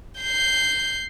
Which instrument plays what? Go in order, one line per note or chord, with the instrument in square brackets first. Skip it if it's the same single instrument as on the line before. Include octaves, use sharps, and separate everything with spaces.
[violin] G6 C7